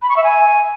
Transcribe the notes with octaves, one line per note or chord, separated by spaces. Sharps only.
B5
C#6
E5
G#5